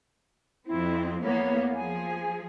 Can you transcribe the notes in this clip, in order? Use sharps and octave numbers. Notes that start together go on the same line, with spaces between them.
F2 C4 E4
E2 A#3 B3 C#5
F3 G#4 G#5